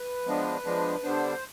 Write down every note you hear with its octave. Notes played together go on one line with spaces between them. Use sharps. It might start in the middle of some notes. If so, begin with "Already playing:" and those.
Already playing: B4
F3 G#3 B3 D4
F3 G#3 B3 D4
D3 G3 B3 D4 C5